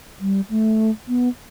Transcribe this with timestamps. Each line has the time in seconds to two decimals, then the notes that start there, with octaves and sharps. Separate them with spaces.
0.20 G3
0.50 A3
1.08 B3